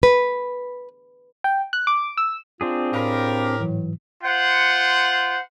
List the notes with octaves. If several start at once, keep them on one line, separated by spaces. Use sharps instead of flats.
B4
G5
F#6
D6
E6
C4 D4 F4 G#4
A2 G4 A#4 F5 B5
G#2 E3 F#3
F4 C5 F#5